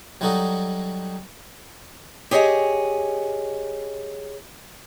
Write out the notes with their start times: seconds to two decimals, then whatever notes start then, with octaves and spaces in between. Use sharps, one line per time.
0.21 F#3 G3 D#4 F#4 A4 D#5
2.31 G4 G#4 C#5 D#5 G#5